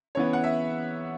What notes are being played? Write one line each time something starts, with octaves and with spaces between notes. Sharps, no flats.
C#3 E3 B3 C#5
F#5
E5